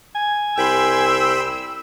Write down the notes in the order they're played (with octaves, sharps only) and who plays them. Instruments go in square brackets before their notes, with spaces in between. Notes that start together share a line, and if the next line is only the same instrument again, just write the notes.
[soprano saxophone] G#5
[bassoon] C2 [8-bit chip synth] G5 B5 C6 [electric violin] E6